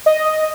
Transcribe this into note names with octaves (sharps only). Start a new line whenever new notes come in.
D#5